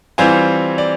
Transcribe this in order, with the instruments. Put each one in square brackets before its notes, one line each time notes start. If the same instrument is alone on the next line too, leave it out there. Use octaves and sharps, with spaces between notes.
[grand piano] E3 G3 C4 F4 G#5
D5